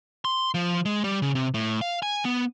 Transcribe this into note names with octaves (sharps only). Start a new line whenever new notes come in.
C6
F3
G#3
G3
C#3
C3
A2
F5
G#5
B3